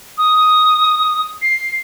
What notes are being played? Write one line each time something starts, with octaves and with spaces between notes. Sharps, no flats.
D#6
C7